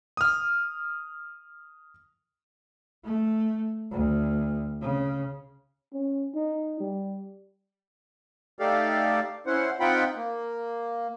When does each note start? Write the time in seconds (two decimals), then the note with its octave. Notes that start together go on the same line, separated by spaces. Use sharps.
0.17 D#6 F6
3.04 A3
3.92 D2
4.81 C#3
5.93 C#4
6.35 D#4
6.80 G3
8.59 A3 D#4 G4 A4 D5 F5
9.46 C#4 E4 C5 F#5
9.80 C4 D#4 F4 F#5 G5 B5
10.16 A#3